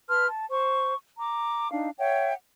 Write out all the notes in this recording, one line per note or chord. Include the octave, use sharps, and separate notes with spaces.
B4 A5 C6 F6
A5
C5 C#6
A#5 D6
D4 D#4 F5
C#5 E5 F#5 G5